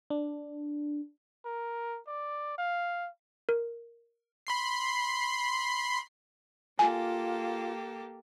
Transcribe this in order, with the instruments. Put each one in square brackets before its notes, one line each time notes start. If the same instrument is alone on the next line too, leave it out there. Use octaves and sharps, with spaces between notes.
[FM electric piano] D4
[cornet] A#4
D5
F5
[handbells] A#4
[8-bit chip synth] B5 C6 C7
[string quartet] A#3 G4 A4 [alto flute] F4 [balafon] G#5